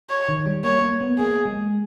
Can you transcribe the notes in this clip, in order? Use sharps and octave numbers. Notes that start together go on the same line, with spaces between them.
C#5
D#3
G3
A#3 C#5
A#3
B3
A#3 G#4
G#3